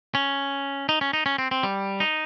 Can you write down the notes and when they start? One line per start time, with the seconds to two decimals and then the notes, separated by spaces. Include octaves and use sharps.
0.15 C#4
0.89 D#4
1.01 C#4
1.13 D#4
1.26 C#4
1.38 C4
1.51 C4
1.63 G3
2.00 D#4